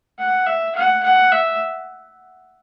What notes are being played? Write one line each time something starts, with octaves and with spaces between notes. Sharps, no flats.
F#5
E5
F#5
F#5
E5